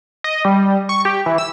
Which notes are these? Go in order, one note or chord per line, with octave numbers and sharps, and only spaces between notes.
D#5
G3
C#6
G4
E3
E6